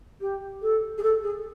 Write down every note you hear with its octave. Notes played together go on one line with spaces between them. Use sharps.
G4
A4
G#4
A4
G#4